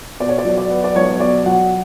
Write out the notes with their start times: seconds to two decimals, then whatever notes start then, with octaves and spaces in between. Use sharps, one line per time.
0.20 B2 D5
0.29 C#5
0.38 D5
0.45 F#3
0.58 D5
0.70 B3
0.84 D5
0.96 B1 C#5
1.20 B2 D5
1.46 F#3 F#5